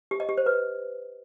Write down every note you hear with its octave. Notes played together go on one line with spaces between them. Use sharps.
G4
D#5
G4
C5
B4